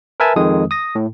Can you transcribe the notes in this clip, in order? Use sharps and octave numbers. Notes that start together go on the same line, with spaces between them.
A#4 B4 E5 G#5 A5
F2 D#3 G#3 D#6
D#6 A#6
A2